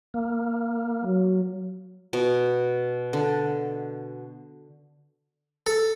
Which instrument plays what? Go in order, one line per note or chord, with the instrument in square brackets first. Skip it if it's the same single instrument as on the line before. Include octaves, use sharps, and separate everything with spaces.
[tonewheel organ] A#3
[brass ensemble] F#3
[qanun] B2
D3
[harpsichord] A4